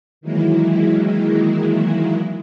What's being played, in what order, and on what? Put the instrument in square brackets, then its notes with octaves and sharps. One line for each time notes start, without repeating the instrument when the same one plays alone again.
[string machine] D#3 E3 F#3 G#3 A#3 E4